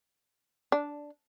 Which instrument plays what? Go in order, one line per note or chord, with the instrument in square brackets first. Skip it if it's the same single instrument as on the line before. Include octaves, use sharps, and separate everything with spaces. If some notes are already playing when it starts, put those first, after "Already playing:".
[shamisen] D4